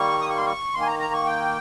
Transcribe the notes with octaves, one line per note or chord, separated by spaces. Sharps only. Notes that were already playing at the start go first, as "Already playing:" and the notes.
Already playing: D#3 G3 A#3 C#6
D#6
C#6
C6
C#6
D#3 A#3 C6
G#5
A#5
A#5
C#6
G5